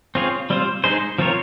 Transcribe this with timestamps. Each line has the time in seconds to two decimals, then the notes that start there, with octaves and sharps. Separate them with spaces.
0.15 C4 F4 G#4 C#5
0.50 G3 C4 F4 C5
0.84 G#3 D#4 G#4 C5
1.18 F3 C4 F4 A#4 C#5